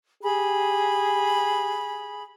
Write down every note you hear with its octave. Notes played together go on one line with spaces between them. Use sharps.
G4 G#4 B5